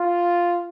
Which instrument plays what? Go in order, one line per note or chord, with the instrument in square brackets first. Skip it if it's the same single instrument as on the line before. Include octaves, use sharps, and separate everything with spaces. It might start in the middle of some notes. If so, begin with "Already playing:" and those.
Already playing: [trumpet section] F4